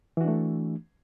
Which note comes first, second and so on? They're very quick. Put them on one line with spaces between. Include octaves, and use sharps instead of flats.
E3 F#4 D4 A3